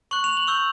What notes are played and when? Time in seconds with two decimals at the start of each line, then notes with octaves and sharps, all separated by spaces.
0.11 C#6 F#6 F#7
0.24 F7
0.37 F#7
0.47 C#6 E6 G6